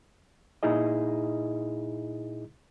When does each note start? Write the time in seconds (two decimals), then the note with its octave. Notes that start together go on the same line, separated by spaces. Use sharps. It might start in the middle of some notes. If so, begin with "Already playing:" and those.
0.63 A#2 D#4 E4 G#4 D#5